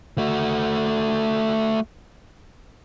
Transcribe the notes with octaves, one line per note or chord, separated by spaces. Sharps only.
A3 F#4